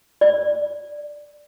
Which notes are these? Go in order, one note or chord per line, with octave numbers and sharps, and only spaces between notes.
D5